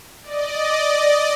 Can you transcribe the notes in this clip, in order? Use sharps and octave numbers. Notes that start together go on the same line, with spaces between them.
D5 D#5